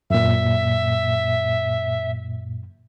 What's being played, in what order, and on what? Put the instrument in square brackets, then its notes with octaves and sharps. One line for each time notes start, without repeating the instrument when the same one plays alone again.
[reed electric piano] F#2 A#2 [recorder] E5